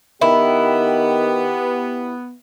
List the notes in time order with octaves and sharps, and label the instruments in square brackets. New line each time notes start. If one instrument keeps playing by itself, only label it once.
[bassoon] D#3 [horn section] B3 [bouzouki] E4 [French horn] G4